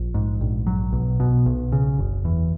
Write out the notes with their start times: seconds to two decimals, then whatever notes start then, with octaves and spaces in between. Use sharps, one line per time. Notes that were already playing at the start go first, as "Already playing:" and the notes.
Already playing: A#1
0.14 G#2
0.41 A#1
0.67 F#3
0.93 B1
1.20 B2
1.46 B1
1.72 C#3
1.99 F#1
2.25 E2